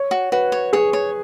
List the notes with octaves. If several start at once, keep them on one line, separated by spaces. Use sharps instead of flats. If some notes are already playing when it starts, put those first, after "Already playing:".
Already playing: C#5
F#4
F#4 B4
C#5
G#4 C#5
C#5